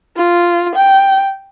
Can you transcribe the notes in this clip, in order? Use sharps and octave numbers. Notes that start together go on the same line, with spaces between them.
F4
G5